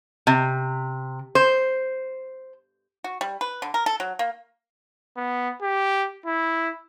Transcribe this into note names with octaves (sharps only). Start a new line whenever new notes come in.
C3
C5
F#4
G3
B4
D3
A#4
A4
F#3
A#3
B3
G4
E4